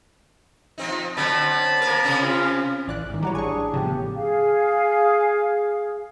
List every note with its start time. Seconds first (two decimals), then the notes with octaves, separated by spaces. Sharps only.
0.78 F3 C4 D#4
1.17 D3 F#3 C4 A5 B5
1.81 A#3 A#4
2.04 C3 C4 C#4
2.23 F4
2.87 A1 E3 D5 F#6
3.10 G#2 D#3
3.23 F#2 G3 F#4 C#5 A#5 D6
3.35 A1 D4 G#4 G#5 C#6
3.74 A2 C#3 F3 B3 G4
4.15 G#4 F5